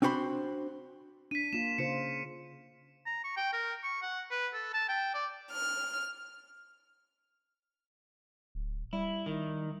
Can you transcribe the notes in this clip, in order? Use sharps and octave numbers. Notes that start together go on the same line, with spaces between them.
C4 D4 F#4 C5 B5 C6
D4 B6 D#7
A#3 F4 E7
C#3 F4 C5 C#7
A#5
C#6
G5
A#4
C#6
F#5
B4
A4
A5
G5
D5
F6
D1
G3 E4
D#3